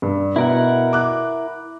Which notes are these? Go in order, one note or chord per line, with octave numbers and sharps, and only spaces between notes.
G2
B2 E4 A#4 F#5
D6 F#6